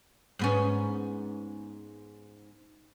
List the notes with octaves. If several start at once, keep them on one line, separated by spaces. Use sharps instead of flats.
G#2 B3 C#4